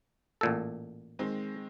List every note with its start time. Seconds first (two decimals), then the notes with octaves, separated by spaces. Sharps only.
0.41 A1 A#2 A4
1.19 D#3 G#3 C4